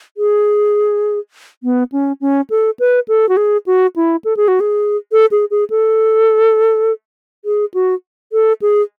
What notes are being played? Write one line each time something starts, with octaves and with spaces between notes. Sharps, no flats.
G#4
B3
C#4
C#4
A4
B4
A4
F#4
G#4
F#4
E4
A4
G#4
F#4
G#4
A4
G#4
G#4
A4
G#4
F#4
A4
G#4